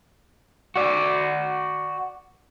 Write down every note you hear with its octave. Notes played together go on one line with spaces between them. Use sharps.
F#4 D5